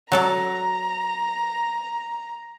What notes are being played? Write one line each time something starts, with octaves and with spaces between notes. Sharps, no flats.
F#3 A4 D5 A#5